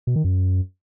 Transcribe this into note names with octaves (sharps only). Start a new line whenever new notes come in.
B2
D#3
F#2